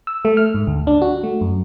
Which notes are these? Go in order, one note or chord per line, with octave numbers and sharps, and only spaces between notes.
E6
A3
F6
G#2
D2
D4
F#4
A3
F#2